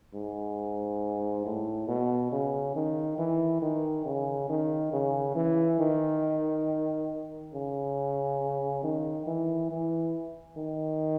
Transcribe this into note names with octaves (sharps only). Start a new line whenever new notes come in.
G#2
A2
B2
C#3
D#3
E3
D#3
C#3
D#3
C#3
E3
D#3
C#3
D#3
E3
E3
D#3